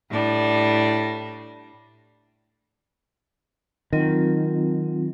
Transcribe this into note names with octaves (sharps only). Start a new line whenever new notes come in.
A2 G3 D4
D#3 F#3 C4 F4